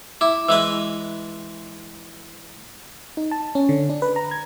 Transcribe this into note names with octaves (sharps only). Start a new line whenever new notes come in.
E4 D6
E3 G#3 B4 E6
D#4
A5
C#4
D3
D4
B4
A#5
G#6